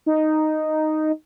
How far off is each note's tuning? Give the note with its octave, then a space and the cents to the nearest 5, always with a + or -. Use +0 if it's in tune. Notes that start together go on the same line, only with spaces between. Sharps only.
D#4 -5